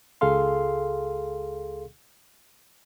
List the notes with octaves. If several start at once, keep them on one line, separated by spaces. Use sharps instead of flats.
C#2 G#4 A4 F5 C6